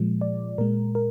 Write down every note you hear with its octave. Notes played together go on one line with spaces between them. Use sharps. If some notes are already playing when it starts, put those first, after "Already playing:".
Already playing: A#2 F3 G#3
D5
A#2 G#3 A#4
A#4